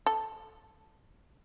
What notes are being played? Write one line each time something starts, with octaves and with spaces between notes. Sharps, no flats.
A4